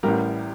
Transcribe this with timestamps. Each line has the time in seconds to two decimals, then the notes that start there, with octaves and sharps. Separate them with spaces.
0.03 A1 A2 G3 G4 A#4